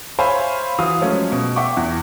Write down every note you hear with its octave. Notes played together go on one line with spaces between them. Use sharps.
C5 C#5 E5 F5 G#5 B5
E3 F#4 F5 D#6
F3 F#3 G#3 A3 C#4
B2
E5 F#5 G5 C#6 D6
E2